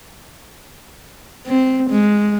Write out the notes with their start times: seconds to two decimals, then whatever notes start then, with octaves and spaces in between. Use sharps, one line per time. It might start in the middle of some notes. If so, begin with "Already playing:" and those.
1.47 C4
1.90 G#3